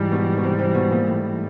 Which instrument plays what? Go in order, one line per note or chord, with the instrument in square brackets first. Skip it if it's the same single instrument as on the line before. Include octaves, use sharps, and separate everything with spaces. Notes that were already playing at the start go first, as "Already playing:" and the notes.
Already playing: [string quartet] G#2 E3 G3
[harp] B2
B2
C3
C3
B2
A#2
A2